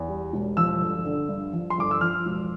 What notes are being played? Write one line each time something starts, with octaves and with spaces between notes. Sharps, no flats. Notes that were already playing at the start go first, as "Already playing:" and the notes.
Already playing: E2
G3
E1
F3 E6
G1
D3
G2
F3
C6
G1 D6
E6
F3 F6
E1